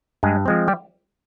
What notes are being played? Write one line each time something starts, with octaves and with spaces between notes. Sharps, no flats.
G2 G#3 G#4
F3 G#3 C4
G3 G4